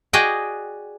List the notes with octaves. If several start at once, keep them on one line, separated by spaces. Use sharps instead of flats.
F#4 G#4 D5 D#5 G5